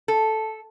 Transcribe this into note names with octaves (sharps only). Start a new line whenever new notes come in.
A4